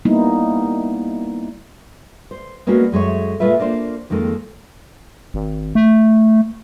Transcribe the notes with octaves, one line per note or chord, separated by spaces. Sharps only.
G3 A#3 B3 D#4 E4
C5
G#3 A#3 B3 C#4 D4 F#4
F#2 G#3 A3 C#5
A#2 G#3 A3 F4 B4 E5
A#3 D4 F4 C5
F2 D#3 G#3 A#3 A4
G#1
A3